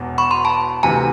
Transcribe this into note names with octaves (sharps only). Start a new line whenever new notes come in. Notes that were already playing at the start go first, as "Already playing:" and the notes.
Already playing: E1 E2 B2
B5 C#6
A#5 C6
A5 B5
D2 C3 E3 G#5 A#5